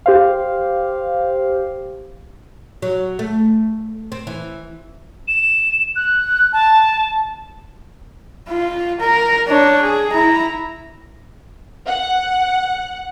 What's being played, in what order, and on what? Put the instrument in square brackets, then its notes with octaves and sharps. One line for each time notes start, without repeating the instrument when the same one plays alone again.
[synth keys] G4 C5 F5
[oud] F#3
A3
C4
E3
[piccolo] E7
F#6
A5
[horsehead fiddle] F4
A#4
D4 C#5
G#4
E4 A#5
[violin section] F#5